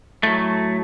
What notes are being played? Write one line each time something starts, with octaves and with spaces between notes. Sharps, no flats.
A2 F#3 A3